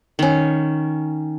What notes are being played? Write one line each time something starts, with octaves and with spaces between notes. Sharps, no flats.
D#3 C#4